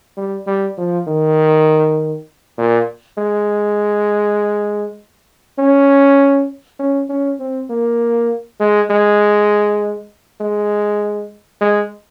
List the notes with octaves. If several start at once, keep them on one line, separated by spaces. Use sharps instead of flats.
G3
G3
F3
D#3
A#2
G#3
C#4
C#4
C#4
C4
A#3
G#3
G#3
G#3
G#3